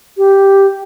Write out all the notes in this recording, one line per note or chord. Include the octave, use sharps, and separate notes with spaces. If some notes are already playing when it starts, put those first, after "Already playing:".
G4